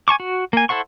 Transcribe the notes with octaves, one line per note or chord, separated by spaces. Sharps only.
G#5 A5 C#6 D6
F#4
A#3 G#5
E4 A4 C5 F#5 C#6